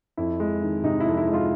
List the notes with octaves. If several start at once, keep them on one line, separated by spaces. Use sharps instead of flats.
F2 E4
G#3
D#3
C3 D#4
E4
F2
E4
G#3
F4